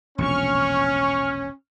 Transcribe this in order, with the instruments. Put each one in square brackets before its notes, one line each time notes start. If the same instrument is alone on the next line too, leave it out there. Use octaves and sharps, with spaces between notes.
[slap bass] E1 A#1 C3 [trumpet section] C#4 [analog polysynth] C#6 F6